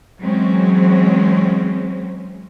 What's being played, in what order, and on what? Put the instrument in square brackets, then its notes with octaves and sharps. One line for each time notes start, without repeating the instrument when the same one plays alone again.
[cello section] E3 F#3 G#3 C4 C#4